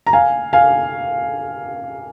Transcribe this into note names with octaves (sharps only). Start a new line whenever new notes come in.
A#5
F5 G#5
F5 G#5